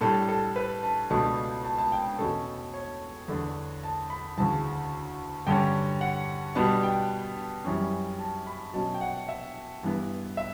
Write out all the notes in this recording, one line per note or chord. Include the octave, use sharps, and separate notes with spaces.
A2 G3 D4 A4
A4
B4
A5
C#2 B2 A3 D4 A5
A5
A5
G5
E2 B2 A3 C#4 A4
C#5
E2 D3 A3 D4
A5
B5
D2 C#3 E3 A5
G2 D3 G3 C#4 G5
F#5
B2 G3 B3 D4 A5
G5
F#2 E3 G3 C#4
A5
B5
B2 F#3 C#4 A5
G5
F#5
E5
G2 E3 B3
E5